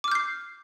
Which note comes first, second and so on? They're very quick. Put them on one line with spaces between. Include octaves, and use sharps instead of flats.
D6 F6 G6 C7